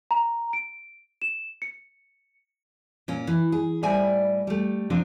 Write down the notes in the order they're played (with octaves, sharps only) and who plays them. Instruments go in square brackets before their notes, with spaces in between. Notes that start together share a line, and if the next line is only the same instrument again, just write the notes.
[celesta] A#5
D7
E7
C#7
[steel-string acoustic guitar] A#2 C#4
E3
G#4
A2 G3 C5 D5 E5 G#5
G3 A3
C3 F3 C4 D4